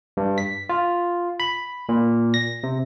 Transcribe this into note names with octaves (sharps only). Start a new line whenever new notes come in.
G2
B6
F4
B5
A#2
A#6
C3